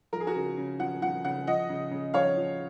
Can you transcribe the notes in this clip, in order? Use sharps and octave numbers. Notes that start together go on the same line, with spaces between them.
F3 A#4
G#4
F#4 A#4
C#3
C#3
F3 F#5
F3 F#5
C#3 F#5
F3 D#5 F#5
C#3
C#3
F3 C#5 F5
F3